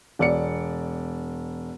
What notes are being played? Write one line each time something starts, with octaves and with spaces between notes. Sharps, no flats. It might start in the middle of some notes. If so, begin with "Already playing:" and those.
E1 D5 C#7